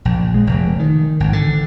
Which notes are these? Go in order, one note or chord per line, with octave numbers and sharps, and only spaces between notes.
A#1
G#3
F1
D#3
G#1
D3